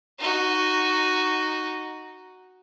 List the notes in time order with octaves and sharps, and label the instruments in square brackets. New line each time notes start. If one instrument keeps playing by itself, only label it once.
[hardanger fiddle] D#4 F#4